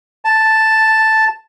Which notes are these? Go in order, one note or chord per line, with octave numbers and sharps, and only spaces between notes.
A5